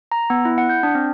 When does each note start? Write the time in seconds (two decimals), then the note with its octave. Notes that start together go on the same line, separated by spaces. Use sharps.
0.12 A#5
0.30 B3
0.45 E4
0.58 F#5
0.69 G6
0.83 D4
0.95 C4